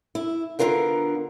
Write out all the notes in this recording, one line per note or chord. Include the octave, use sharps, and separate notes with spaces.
E4
D3 B3 F4 A#4 F#5